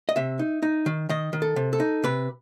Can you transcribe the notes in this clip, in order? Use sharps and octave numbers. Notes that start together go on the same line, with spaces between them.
D#5
C3 E5
D#4
D#4
D#3
D#3 D#5
D#3
A4
C3
A4
D#4
C3 B4